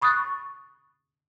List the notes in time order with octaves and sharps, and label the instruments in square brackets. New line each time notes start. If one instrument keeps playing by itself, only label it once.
[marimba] B5 C#6 D#6 F#6 A6